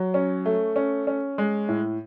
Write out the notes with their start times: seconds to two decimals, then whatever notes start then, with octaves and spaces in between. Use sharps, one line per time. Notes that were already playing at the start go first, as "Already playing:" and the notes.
Already playing: F#3
0.14 C#4
0.46 A3
0.76 C#4
1.07 C#4
1.38 G#3
1.69 A2